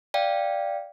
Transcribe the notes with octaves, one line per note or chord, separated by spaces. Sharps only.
D5 F5 G5